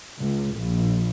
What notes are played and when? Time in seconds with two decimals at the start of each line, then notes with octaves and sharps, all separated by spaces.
0.21 C#2
0.59 A#1